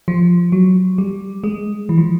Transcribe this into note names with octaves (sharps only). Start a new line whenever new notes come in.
F3
F#3
G3
G#3
E3
F3